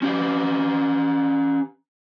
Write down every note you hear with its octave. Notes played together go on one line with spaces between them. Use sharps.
C#4 G4 B4